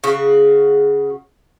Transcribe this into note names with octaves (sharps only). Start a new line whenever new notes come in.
C#3 F#4